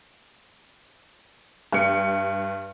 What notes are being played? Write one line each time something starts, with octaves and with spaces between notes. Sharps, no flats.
G2 C#7